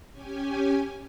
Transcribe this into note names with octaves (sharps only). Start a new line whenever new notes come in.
C#4 G4 G#5